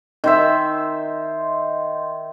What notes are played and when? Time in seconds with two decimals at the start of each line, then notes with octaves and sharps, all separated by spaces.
0.24 D#3 C5 E5